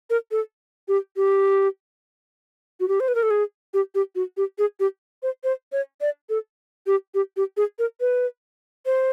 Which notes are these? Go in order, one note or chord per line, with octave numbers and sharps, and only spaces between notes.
A#4
A4
G4
G4
F#4
G4
C5
B4
A#4
A4
G#4
G4
G4
F#4
G4
G#4
G4
C5
C5
C#5
D5
A4
G4
G4
G4
G#4
A#4
B4
C5